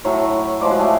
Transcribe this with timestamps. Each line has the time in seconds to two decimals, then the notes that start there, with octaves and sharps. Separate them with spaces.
0.05 A2 F#3 A3 C#5
0.61 A2 F3 G#3 D5
0.71 F#4
0.80 A3